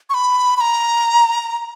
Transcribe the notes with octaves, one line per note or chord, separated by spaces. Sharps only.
C#6
B5
B5
A#5